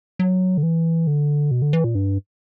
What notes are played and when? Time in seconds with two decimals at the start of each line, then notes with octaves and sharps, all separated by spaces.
0.19 F#3
0.57 D3
0.63 E3
1.07 D3
1.51 B2
1.62 D3
1.73 E3
1.84 A#2
1.95 G2